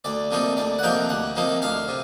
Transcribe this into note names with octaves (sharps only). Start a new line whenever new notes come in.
D2 D5
C3 F3 A#3 D#4
D2 D5
F#5
C3 F3 A#3 D#4 G5
D2 F#5
C3 F3 A#3 D#4
D2 F5
C3